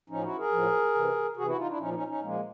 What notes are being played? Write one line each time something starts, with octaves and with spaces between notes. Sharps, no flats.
A2 F3 C#4 D#4
E4 F#4
G#4 A#4
A2 F3
C3 E3
C3 E3 F#4 G#4
E4 F#4
D#4 F4
D4 E4
A#2 F3 C#4 D#4
C#4 D#4
C#4 D#4
A#2 F3 G#3 A#3